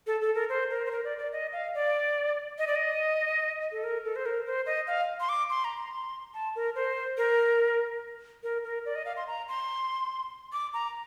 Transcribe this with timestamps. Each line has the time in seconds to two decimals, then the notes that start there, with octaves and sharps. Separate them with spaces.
0.07 A4
0.21 A4
0.35 A#4
0.49 C5
0.70 A#4
0.86 C5
0.91 A#4
1.04 D5
1.18 D5
1.32 D#5
1.53 F5
1.74 D5
2.58 D#5
2.67 D5
2.75 D#5
3.72 A4
3.84 A#4
4.05 A4
4.16 C5
4.26 A#4
4.46 C5
4.66 D#5
4.87 F5
5.20 C6
5.29 D6
5.50 C6
5.65 A#5
5.78 C6
6.34 A5
6.56 A#4
6.75 C5
7.18 A#4
8.43 A#4
8.64 A#4
8.86 D5
8.95 D#5
9.05 F5
9.17 C6
9.27 A#5
9.48 C6
10.53 D6
10.74 A#5